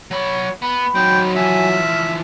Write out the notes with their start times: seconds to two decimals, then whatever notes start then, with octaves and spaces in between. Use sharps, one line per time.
0.11 F#3 C#5 B5
0.62 B3 B5
0.95 F#3 C4 D#4 G5
1.36 E3 F3 E5 G#5
1.72 F6